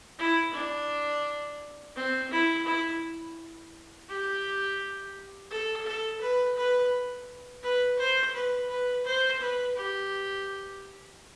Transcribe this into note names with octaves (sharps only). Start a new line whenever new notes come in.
E4
D4
C4
E4
E4
G4
A4
A4
B4
B4
B4
C5
B4
B4
C5
B4
G4